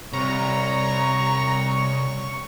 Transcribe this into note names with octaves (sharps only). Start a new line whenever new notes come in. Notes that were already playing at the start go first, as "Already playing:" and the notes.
C2 C#5 A#5 C#6